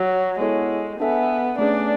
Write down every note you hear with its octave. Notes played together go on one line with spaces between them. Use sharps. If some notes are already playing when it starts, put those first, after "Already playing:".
Already playing: F#3
G#3 B3 E4 A4 C#5
B3 D4 A4 E5 G#5
A3 C#4 D4 G#4 B4